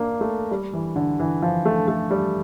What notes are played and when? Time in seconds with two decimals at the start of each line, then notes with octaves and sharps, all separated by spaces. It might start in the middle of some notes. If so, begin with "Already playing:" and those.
Already playing: A#3 D4
0.21 A3
0.51 G3
0.73 E3
0.96 D3
1.20 E3
1.42 F3
1.65 A3
1.88 A3
2.11 G3